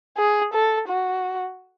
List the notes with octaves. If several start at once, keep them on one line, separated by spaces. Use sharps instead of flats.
G#4
A4
F#4